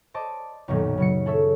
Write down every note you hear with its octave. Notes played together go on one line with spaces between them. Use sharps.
C5 D5 D#5 A5 D6
B1 F#2 A#2 D#3 F#3
C#3 F#3 C#7
G#4 A4 C#5 E5